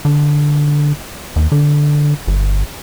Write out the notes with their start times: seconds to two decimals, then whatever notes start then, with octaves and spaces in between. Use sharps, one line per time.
0.05 D3
1.36 D#2
1.52 D3
2.28 G1